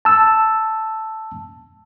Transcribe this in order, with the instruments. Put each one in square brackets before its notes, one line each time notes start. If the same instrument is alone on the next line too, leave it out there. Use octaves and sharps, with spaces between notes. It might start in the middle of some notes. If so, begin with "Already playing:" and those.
[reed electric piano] A5 E6